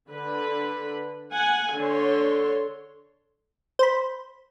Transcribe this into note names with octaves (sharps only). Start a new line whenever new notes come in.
D3 B4
F#5 G#5
D3 C#5 C6
C5 B5